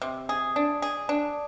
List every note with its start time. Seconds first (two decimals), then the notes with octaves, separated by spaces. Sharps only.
0.02 C3
0.29 G#4
0.56 D4
0.82 G#4
1.09 D4